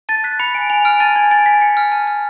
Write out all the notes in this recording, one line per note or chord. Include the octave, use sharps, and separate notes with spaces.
A5 A6
F#6 B6
B5 C#7
G#5 D7
G#5 F7
F6 D7
A5 A6
G#5 G#6
G#5 A6
G#5 B6
G#5 C#7
F6
A5
F6